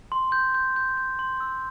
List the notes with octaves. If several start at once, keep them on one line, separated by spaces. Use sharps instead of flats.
C6
G6
G6
G6
G6
C6
E6